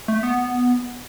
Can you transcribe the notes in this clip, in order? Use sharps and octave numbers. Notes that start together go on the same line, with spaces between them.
A3
B3